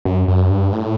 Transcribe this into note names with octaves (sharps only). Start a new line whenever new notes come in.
F#2
F#2
G2
A2